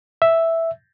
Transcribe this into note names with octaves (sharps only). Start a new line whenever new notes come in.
E5